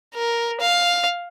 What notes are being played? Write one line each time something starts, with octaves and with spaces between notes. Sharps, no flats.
A#4
F5